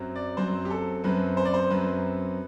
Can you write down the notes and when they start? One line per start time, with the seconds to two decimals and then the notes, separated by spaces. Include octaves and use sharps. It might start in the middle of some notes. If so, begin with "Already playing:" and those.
Already playing: F#2 F#3 C4
0.16 D5
0.37 F#2 F#3 C4 C5
0.65 G4
0.70 A4
1.04 F#2 F#3 C4 B4
1.37 C5
1.45 D5
1.54 C5
1.70 F#2 F#3 C4 B4